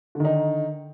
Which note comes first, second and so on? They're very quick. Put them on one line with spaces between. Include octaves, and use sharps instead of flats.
D3 D#3 D#4